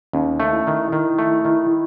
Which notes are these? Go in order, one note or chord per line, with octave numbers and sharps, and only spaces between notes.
D#2 C#4
A3
E4
D#3
D#3
A3
D#3